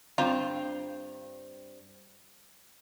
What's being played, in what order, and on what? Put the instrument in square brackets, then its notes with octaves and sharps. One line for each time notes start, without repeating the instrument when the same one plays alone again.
[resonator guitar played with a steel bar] G2 C4 A#5 [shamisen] F4